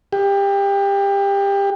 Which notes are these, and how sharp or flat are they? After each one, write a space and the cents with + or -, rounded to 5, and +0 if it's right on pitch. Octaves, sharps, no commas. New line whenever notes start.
G4 +25